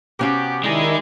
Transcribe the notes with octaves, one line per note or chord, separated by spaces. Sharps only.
C3 B3 C#4 F#4 G4 F5
D#3 G#3 D#4 E4 G4 G#4 D5